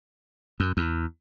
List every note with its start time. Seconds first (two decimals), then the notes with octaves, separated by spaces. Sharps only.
0.60 F#2
0.77 E2